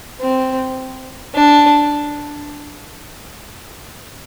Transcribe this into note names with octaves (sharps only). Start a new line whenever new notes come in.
C4
D4